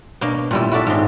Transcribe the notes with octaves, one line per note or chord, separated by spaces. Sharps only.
B2 A#3 D4
A#2 G3 E4
E4 F#4 A4 D5 E5
G#2 C4